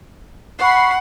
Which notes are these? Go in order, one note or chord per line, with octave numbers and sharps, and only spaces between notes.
F#5 B5 C#6 C7